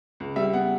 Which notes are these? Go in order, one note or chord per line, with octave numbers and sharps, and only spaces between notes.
C#2
G3 E5
B3 F#5